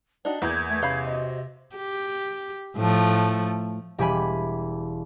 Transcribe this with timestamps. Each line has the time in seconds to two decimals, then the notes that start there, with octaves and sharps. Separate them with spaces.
0.25 D4 D#4 F#4 C#5 G5
0.42 E2 A#3 B3 E4 G6 G#6
0.70 A3
0.82 C3 C#4 F5 B5
1.05 F#4 C5 D#5
1.75 G4
2.77 A2 F3 A3
3.98 E1 G3 G4 E5 G#5 B5